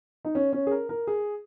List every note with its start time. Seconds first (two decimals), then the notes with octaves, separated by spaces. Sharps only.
0.25 D#4
0.35 C#4
0.53 C#4
0.67 G#4
0.71 A#4
0.89 A#4
1.07 G#4